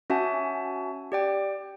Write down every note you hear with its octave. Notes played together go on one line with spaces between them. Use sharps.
C#4 F#4 E5 F#5 G#5 A5
G4 D5 G5